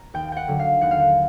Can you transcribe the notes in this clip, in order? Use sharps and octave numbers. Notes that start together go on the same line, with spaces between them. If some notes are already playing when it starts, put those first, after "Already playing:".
Already playing: A#5
D#2 G5
F#5 G5
D3 F#3
F5
D#2 F#5
F5
F#5